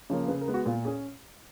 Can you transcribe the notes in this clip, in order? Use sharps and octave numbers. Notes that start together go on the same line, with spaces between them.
C#3 F3 A#3 C#5
C#3 B4
A#4
G#3 B3
F#4
A#2 F4
C#4 G#4